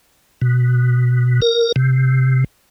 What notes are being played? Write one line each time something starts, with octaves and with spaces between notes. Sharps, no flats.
B2
A#4
C3